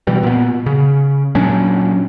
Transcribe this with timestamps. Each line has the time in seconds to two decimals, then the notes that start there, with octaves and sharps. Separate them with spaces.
0.07 B2 E3 G3
0.23 A#2 B3
0.66 C#3
1.35 A#2 F#3 C#4 D4